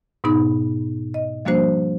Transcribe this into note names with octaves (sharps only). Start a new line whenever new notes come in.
G#2 B2 B3 D#4 B5
D#5
F3 G3 A#3 D4 F#4 C5